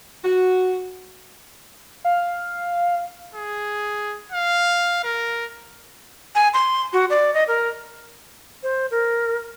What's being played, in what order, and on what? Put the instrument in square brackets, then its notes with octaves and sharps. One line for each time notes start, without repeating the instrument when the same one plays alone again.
[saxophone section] F#4
[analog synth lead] F5
[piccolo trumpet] G#4
F5
A#4
[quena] G#5
C6
F#4
D5
D#5
A#4
C5
A#4